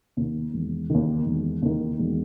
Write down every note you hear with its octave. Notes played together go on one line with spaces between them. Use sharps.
D#2 D#3
E1
D#2 D#3
E1
D#2 D#3
E1